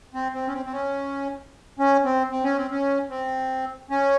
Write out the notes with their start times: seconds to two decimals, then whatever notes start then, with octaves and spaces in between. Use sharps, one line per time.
0.14 C4
0.34 C4
0.48 C#4
0.53 C4
0.66 C4
0.72 C#4
1.79 C#4
2.05 C4
2.31 C4
2.44 C#4
2.58 C4
2.71 C#4
3.10 C4
3.90 C#4